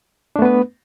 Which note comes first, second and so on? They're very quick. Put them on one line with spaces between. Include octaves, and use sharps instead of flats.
D4 A3 B3 B4